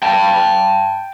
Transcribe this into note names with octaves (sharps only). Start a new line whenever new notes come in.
G5 A5